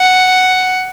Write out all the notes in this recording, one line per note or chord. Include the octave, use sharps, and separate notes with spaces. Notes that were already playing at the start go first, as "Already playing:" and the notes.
Already playing: F#5